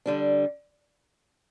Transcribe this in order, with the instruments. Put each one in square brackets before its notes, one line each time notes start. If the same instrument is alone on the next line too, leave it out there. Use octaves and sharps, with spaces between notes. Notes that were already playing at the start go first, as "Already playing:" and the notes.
[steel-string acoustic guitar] D3 G3 D4